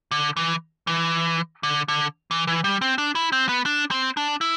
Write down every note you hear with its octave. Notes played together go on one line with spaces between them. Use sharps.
D3
E3
E3
D3
D3
E3
E3
G3
C4
D4
E4
C4
B3
D4
C4
D4
E4